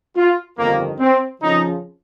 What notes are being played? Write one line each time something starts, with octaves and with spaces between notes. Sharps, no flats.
F4
G1 F2 D#3 A#3
C4
F2 C#3 F3 D#4